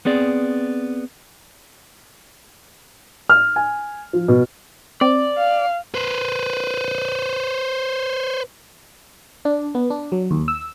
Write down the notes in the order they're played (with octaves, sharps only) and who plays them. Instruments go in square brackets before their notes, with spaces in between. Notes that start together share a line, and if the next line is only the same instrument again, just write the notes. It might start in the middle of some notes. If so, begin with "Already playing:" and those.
[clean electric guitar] B3 C4 G#4 D5
[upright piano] F6
G#5
F3
B2
[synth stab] C4 [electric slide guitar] D5
[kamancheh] F5
[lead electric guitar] B4 C5
[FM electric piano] D4
B3
D4
F#3
D#2
E6